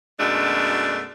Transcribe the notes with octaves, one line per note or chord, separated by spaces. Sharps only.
F#2 B2 G#3 A3 D4